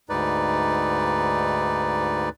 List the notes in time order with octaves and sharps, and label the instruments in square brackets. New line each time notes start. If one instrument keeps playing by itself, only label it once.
[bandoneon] D2 G#2 D#4 B4 D5